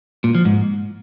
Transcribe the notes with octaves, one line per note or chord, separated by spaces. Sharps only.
A#2
F3
G#2